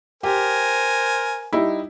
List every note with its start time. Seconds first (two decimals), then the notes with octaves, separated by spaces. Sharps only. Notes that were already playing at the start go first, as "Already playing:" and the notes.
0.23 G4 A#4 C5 G#5
1.53 G3 D#4 E4